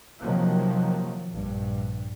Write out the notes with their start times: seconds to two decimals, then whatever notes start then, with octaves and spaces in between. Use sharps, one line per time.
0.21 C3 D#3 F3 F#3 A#3
1.34 A#1 G2